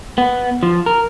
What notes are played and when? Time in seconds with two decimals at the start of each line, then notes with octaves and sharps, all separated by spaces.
0.18 B3
0.63 F3
0.86 A#4